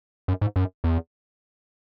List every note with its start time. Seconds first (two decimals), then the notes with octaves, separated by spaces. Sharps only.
0.28 F#2
0.41 G#2
0.56 F#2
0.84 E2